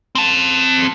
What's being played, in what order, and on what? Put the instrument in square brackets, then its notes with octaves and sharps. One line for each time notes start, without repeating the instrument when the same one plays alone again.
[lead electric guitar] C4 A5